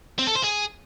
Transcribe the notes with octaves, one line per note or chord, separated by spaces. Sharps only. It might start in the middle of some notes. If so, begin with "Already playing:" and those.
C4
A4
C5
G#4